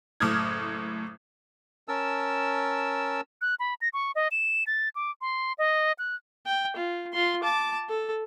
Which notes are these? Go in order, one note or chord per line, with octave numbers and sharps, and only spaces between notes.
F#1 A2 D6 D#6 F6 G#6
C#4 A#4 A5 E6
F#6
B5
A#6
C#6
D#5
E7
A6
D6
C6
D#5
F#6
G5
F4
F4 C6
A5 D6
A4